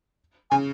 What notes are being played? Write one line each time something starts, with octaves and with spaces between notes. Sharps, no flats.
C#3 G#5